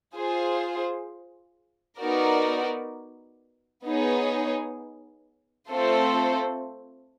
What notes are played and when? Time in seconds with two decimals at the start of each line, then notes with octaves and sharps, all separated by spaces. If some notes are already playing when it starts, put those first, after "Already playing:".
0.15 F4 G#4 C5
1.99 B3 D#4 F#4 A#4 D5
3.85 B3 D#4 G#4 C#5
5.70 A3 C4 F4 A4 C5